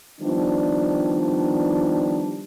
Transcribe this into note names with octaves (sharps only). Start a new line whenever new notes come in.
D#3 F3 G3 B3 D4